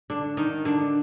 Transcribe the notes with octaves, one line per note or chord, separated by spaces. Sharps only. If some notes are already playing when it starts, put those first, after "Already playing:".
D3 D4
D#3 D#4
D3 D4